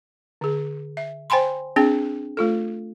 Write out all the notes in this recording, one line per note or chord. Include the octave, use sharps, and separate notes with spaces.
D3 G#4
E5
C5 G5 G#5 B5 C6
C4 D4 G#4 G5
A3 F4 A4